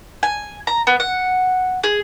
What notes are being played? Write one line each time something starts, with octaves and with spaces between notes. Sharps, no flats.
G#5
A#5
B3
F#5
G#4